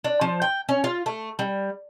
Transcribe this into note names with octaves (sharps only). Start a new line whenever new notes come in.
D4
F3
G5
C#4
F4
A3
G3